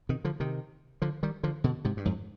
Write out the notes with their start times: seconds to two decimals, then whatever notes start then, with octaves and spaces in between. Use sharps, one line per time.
0.09 C3 D#3
0.25 D3 F3
0.40 C3 D#3
1.02 D3 F3
1.23 D#3 G3
1.43 D3 F3
1.64 B2 D3
1.85 G#2 C3
1.97 G2
2.05 F2 G#2